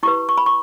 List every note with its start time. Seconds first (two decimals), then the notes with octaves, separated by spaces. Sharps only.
0.03 E4 G4 B4 C#6
0.29 C#6
0.38 B5
0.46 C#6